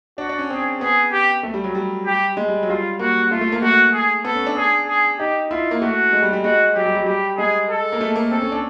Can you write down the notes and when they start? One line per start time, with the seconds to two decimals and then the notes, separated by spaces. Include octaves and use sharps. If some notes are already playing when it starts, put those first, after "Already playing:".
0.18 D4 F#4
0.29 D4
0.39 C#4
0.50 C4 G#4
0.81 B3 G#4
1.12 G4
1.43 A3
1.54 G3
1.64 F#3
1.75 G3
2.06 G4
2.37 G#3
2.48 G3
2.63 F#3
2.69 G3 F4
2.99 A#3 F#4
3.31 A3 F4
3.41 A3
3.52 A#3
3.62 A3 F#4
3.93 G#4
4.25 B3 A4
4.35 C#4
4.46 D4
4.56 G#4
4.88 G#4
5.19 D#4 G4
5.50 E4 F4
5.71 A#3
5.82 A3 F#4
6.13 G#3
6.23 G3
6.33 G3
6.44 G#3 F#4
6.75 F#3 G4
6.86 G3
6.96 F#3
7.06 G3 G4
7.38 G#3 G#4
7.69 A4
7.92 A#3
8.01 A3
8.16 A#3
8.31 C4 A4
8.41 C#4
8.52 D4